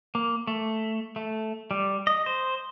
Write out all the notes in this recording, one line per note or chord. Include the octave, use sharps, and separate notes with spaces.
A#3
A3
A3
G3
D#5
C5